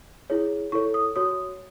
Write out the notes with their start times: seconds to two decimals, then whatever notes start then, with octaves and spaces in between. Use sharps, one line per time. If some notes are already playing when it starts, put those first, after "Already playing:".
0.30 E4 G#4 C#5
0.72 E4 A4 C#5 C#6
0.94 D#6
1.16 F#4 C#5 D#6